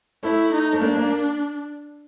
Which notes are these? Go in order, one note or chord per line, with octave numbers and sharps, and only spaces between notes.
A3 E4
D#4
A3
A#3 D4
A#3